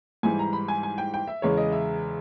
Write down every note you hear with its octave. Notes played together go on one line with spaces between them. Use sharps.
G#2 E3 G3 G#5
A#5
B5
G#5
G#5
G5
G5
E5
E2 C#3 G#3 C#5
D#5
E5